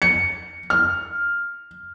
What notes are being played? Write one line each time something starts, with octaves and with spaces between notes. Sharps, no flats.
C#7
F6